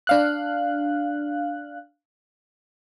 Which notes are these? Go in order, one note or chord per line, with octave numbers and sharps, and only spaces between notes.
D4 F5 F#6